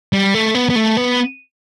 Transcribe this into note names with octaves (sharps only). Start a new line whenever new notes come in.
G3
A3
B3
B3
A3
B3